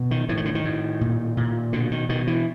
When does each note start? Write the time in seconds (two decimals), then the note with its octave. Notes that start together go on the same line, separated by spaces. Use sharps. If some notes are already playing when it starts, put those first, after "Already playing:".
Already playing: B2
0.11 D#3
0.29 A2 E3
0.37 D#3
0.45 D3
0.55 D#3
0.65 A2
1.01 A#2
1.37 A#2
1.73 B2 D3
1.91 D#3
2.09 B2 D#3
2.27 E3